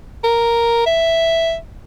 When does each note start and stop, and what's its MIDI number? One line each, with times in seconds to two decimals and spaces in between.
0.24 0.85 70
0.86 1.56 76